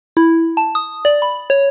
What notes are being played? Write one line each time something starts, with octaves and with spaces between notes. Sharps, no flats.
E4
A5
D#6
D5
B5
C#5